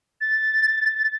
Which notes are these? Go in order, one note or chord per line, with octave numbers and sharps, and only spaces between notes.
A6